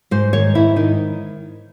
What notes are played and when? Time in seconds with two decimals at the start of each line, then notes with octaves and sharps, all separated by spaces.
0.11 G#2 C5
0.33 D#3 C#5
0.55 G#2 E4
0.76 D#3 D#4